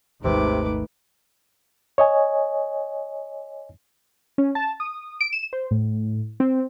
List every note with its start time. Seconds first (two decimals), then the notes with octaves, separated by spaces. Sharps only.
0.24 G#1 D#2 C3 D#3 G#3 A3 B4 D6
1.98 C#5 D#5 G#5
4.38 C#4
4.55 A5
4.80 D#6
5.21 D7
5.33 E7
5.53 C5
5.71 A2
6.40 C4